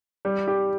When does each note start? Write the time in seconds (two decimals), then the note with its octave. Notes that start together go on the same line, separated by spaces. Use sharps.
0.25 G3
0.48 G4